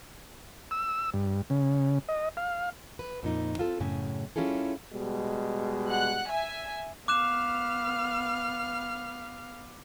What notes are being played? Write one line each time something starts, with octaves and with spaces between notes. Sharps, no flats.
E6
G2
C#3
D#5
F5
B4
F2 A#2 D#4
C4 F4 A4
F#2 A2 C#3 G#5
G3 C#4 E4 F4 G#4 A4
B2 G3 G#3
F#5 F#6
E5 G#5
B3 F5 D6 F6 F#6 E7